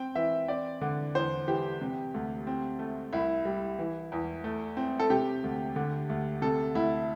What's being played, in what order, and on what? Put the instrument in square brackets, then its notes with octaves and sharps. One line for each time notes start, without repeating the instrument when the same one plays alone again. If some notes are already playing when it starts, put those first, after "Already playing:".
Already playing: [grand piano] C4 G5
E3 E5
C4 D5
D3
E2 C5
E3 G4
C3
D2
C4
A3
C2 E4
G3
E3
E2
A3
C4
A4
C3 G4
D2
D3
D2
C3 A4
D2 E4